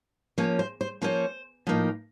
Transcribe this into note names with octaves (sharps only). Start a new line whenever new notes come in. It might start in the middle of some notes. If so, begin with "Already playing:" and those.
F3 A#3 C#4 C#5
C5
C5
F3 A#3 C#4 C5
A2 F3 A#3 D#4